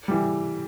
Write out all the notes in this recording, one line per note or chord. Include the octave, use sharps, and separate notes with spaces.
E3 G3